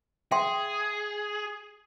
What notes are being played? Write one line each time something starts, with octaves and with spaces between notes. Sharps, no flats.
G#4 E5 G5 C6